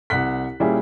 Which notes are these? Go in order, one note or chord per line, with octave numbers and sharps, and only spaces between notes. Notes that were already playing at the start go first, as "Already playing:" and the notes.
C2 F#5 F#6 B6
A#2 G3 C#4 E4 G#4